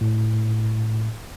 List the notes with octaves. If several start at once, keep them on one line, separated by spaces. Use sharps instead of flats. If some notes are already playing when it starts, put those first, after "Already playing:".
A2